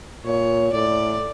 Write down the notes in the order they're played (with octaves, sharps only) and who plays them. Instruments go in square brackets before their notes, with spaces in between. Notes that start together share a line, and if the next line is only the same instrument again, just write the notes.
[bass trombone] A#2 [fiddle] C#5
[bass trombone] A2 [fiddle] D5